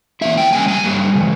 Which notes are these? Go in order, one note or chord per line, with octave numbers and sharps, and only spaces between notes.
E3 A#3 E4 E5
G5
C#3 G3 A#3 G#5
G#5
G2 G3 A#3
C#3 E3 G#3